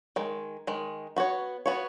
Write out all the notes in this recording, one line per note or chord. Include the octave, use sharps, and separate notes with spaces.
D#3 G#3
D#3 G#3
B3 F#4 C#5
B3 F#4 C#5